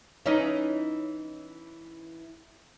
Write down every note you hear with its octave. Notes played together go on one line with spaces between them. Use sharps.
E3 C#4 D#4